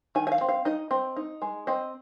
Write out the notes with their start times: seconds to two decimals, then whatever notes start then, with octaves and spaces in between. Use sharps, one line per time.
0.15 D#3 G#5
0.27 G#5
0.32 F5
0.41 C4
0.49 F5
0.65 D#4 D#5
0.91 C4
1.16 D#4
1.42 G#3
1.67 C4 D#5